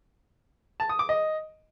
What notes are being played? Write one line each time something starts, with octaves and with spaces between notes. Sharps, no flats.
A5
D#6
D6
D#5